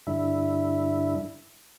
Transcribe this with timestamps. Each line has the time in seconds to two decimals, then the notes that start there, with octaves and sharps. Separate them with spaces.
0.07 G2 D3 E4